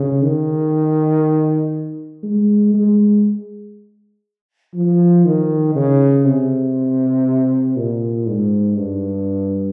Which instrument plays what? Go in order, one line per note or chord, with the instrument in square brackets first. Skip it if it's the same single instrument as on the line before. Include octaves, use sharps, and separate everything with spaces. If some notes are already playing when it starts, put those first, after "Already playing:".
Already playing: [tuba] C#3
D#3
G#3
G#3
F3
D#3
C#3
C3
A#2
G#2
G2